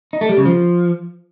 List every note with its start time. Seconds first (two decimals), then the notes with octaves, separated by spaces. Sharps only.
0.13 D#4
0.21 A3
0.29 G3
0.37 C#3
0.45 F3